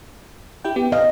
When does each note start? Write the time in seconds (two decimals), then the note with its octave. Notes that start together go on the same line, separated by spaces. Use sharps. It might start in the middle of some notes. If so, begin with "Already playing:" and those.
0.64 E4 G4 G5
0.76 B3 G4
0.92 D#5 F5